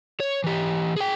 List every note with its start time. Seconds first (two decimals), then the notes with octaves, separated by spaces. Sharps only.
0.20 C#5
0.44 E3 G4
0.96 G#4 G5